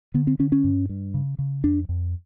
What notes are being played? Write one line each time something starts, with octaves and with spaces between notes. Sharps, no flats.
D3 B3
C4
D3 C#4
C#4
G2
G2
C#3
C#3
F2 D4
F2